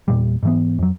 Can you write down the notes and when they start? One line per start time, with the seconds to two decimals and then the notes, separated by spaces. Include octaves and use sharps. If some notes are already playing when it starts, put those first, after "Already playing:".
0.08 E2 A#2 G3
0.43 G#2 E3 B3
0.79 F2 F#3